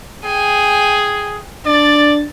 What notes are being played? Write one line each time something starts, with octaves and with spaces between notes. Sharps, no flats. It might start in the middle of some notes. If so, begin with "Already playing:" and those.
G#4 G5 G#5
D4 D5 A6